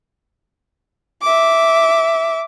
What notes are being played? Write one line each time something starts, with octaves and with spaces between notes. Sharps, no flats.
E5 D6